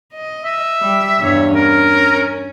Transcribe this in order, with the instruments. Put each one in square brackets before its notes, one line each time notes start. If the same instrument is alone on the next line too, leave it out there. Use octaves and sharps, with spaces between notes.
[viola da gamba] D#5
[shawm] E5
[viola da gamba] G3
E2 G2 C#5
[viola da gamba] C#4 [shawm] A#4